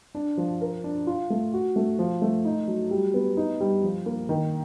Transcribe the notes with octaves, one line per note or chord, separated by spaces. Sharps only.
D4
F3
A#4
D4
F4
A3
F#4
A3
F3
A3
D#4
F#3
G3
B3
D#4
G3
F3
A#3
D#3